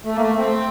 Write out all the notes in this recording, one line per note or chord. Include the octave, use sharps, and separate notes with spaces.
A3
A#3
A3
C4